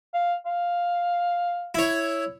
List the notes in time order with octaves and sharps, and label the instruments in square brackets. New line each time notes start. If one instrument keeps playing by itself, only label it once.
[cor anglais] F5
F5
[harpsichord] E4 C#5